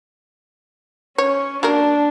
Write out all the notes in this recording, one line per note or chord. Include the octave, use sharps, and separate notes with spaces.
C#4 C#5
F#3 A#3 D4 A#4